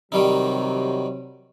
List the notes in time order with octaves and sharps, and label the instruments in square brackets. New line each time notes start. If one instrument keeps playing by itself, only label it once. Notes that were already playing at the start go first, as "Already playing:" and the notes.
[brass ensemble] C3 F#3 [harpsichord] D#3 G3 D#4